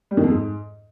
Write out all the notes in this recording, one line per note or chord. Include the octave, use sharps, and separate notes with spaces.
G3
D#3
F2
G#2